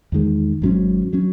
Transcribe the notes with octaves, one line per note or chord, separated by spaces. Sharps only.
E2 D#3 G#3
G#1 G#2 F#3 C#4
F#3 C#4